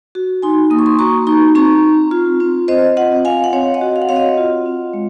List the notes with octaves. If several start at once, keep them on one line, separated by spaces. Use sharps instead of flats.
F#4
D#4 G#5 C6
A#3 D#6
C#6
C6 D#6
F#4 A#5 C#6
D#4 A#5 C#6
C4 A#5 C#6
C4
F4
C4
C4 C5 D#5
F4 D#5 F#5
C4 F5 G#5
F#5
C4 C#5 F5
D#5 F#5
F#4
F5
F#5
C4 C#5 F5
D#5 F#5
F4
C4
G#3